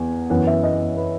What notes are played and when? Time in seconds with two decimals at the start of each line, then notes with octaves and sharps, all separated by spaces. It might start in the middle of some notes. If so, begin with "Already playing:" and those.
Already playing: E2 G#5
0.30 F#2 E3 B3 F#5
0.47 E5
0.63 D#5
0.97 B4